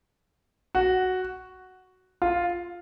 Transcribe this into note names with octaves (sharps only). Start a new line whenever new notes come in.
F#4
F4